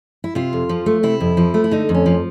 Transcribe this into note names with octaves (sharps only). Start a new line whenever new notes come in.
E4
C3 F4
F2
F3
A3
C3 E4
F2
F3
A3
E4
D3 D#4
F2
C#4
F3